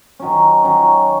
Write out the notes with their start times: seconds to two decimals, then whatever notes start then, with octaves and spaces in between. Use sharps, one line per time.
0.20 D#3 F#3 C#4
0.64 D#3 F#3 C#4